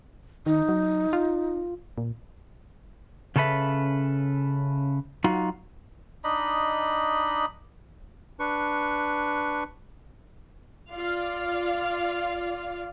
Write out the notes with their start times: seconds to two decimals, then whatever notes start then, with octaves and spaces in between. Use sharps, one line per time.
0.46 D#3 D#4
0.69 F#3
1.13 F4
1.98 A#2
3.36 C#3 C#4 A4 B4 E5
5.24 F#3 D#4 F4 F#4
6.24 D4 D#4 D#5 B5
8.40 D4 B4 C#6
10.93 F4 D5 F5